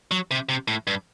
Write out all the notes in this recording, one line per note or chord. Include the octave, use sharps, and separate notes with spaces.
F#3
C3
C3
A2
G2